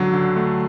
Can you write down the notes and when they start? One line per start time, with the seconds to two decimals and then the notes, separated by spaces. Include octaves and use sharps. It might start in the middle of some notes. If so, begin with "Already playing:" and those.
Already playing: C#2 D3 F#3
0.14 D3
0.36 A3